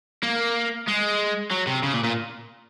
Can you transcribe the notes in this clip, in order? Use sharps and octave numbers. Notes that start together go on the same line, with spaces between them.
A#3
G#3
F#3
C3
C#3
A#2
A#2